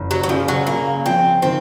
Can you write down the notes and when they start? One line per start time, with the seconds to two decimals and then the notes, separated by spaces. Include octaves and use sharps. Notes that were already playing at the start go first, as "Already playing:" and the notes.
Already playing: F#1
0.11 F#3
0.23 F#3
0.29 C#3 F3
0.48 F#3
0.67 C#3 A#3
1.05 F3 C4
1.42 D#3 C4